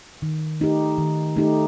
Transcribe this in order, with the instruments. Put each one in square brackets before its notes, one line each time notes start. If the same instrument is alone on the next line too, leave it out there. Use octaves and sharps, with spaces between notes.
[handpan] D#3
A3 D#4 G4
D#3
A3 D#4 G4